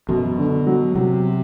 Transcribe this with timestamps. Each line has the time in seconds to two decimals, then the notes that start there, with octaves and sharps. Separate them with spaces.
0.09 F#2 B2
0.39 D3
0.67 F#3
0.95 C3 F#3